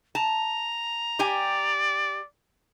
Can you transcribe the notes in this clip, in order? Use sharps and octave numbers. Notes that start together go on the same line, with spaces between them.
A5 A#5
G4 D5 G5 G#5